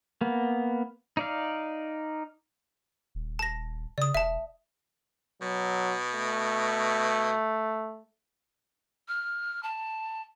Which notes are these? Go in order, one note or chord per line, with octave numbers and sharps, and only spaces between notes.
A#3 B3
D#4 D5 F5
D#1
A5 A#6
C#3 D5 D#6
E1 E5 A5
B2 F#3
A3
F6
A5